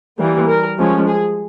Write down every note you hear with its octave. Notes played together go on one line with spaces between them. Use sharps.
E3 G3 A#3
A#4
F3 G#3 C#4
G#4